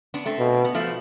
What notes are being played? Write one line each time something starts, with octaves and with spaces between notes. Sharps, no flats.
B3 D4
A3 C4
B2
B3
F3 A3